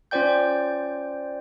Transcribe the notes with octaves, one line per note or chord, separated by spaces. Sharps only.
C#4 F4 C5 D5 G5 G6